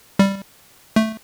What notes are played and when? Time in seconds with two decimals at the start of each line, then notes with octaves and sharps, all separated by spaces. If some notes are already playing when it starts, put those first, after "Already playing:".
0.19 G3
0.96 A3